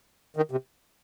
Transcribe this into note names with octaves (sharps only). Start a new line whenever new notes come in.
D#3
C3